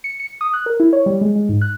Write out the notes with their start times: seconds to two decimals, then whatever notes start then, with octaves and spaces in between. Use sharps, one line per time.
0.04 C#7
0.20 C#7
0.41 D#6
0.53 F#6
0.66 A#4
0.80 E4
0.93 C#5
1.06 G3
1.21 G#3
1.36 G#3
1.49 G#2
1.62 F#6